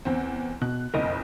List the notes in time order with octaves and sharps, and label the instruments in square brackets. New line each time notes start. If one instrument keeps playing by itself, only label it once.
[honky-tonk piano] E2 C4
[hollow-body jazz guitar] B2 [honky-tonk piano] F#6
[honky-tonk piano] F#1 B1 F2 [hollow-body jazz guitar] A#4 D#5